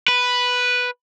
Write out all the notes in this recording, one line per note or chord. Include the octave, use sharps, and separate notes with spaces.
B4